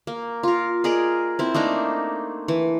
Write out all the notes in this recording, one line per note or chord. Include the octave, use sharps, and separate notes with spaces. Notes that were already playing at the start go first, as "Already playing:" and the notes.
A#3
F4 A#4
G#4 A#4 D5 D#5
C4 E4
A3 A#3 D4 D#4
E3